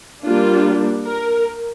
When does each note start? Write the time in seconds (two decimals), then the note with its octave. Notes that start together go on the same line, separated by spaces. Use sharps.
0.24 G3 A#3 D4 F4
1.05 A#4